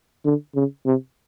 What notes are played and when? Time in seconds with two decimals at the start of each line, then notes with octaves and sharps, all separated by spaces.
0.25 D3
0.55 C#3
0.86 C3